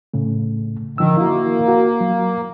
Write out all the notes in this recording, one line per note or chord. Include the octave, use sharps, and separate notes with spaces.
A2 C#3 A3
D3 D#3 F3 E6
A#3 E4 F#4
F#4
F#3